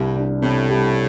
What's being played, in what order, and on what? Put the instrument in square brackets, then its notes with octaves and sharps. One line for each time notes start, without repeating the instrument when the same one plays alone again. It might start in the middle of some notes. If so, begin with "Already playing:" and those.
Already playing: [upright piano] C2 C3 G3 [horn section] G2
[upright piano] D4
[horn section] A2 [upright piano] C3
[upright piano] G3